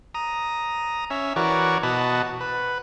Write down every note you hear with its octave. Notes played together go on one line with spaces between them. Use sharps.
A#5 D#6
C#4 E5
E3 F#4 A#4 C#5 D5
B2 F#4 D#5 A5 B5
B4